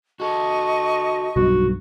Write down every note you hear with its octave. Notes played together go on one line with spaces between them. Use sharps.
F#4 A4 D#5 C#6
F1 B1 G2 F#4